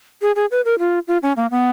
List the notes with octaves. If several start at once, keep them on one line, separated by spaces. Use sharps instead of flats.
G#4
G#4
B4
A#4
F4
F4
C#4
A#3
B3